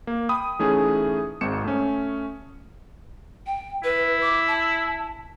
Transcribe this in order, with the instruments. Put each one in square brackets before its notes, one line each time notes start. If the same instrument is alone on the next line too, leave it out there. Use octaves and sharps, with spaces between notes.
[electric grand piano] A#3
G5 B5 D#6
E3 A3 C#4 D#4 G#4
G#1 G#2 C4 C#7 E7
A3 C#4
[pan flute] G5
[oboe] E4 [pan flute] B4
[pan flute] D6
A5